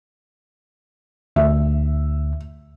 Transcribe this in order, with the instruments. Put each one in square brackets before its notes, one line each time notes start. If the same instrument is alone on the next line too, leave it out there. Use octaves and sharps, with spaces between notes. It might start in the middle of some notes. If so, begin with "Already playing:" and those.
[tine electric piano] D2 [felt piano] E5